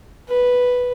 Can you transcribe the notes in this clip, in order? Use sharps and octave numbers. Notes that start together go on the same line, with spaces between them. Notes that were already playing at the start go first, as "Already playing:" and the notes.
B4